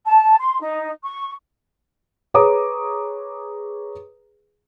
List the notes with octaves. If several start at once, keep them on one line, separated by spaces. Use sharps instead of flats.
A5
C6
D#4
C#6
G#4 B4 C#5 A#5 D6 D#6